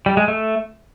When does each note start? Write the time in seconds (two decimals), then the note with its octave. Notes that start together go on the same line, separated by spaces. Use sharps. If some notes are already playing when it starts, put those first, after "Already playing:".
0.06 G3
0.17 G#3
0.28 A3